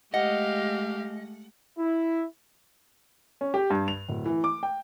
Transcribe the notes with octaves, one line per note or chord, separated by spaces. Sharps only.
G#3 A3 G4 D#5 F5 F#5
E4
C#4
G4
G2
F7
D1
E3
D6
G5